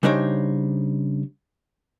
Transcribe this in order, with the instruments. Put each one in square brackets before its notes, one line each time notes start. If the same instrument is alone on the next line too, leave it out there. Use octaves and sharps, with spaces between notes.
[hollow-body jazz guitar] C#3 G3 D4 D#4 C5 C#5